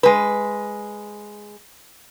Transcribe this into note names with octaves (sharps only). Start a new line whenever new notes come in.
G#3 B4